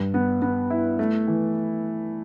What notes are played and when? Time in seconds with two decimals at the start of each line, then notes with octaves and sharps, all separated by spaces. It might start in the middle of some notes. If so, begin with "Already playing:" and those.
Already playing: G2
0.14 B3
0.42 B3
0.70 E4
0.99 A3
1.28 E3